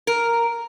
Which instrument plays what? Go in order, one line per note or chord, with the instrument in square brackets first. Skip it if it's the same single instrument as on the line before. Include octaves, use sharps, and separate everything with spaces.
[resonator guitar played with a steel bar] A#4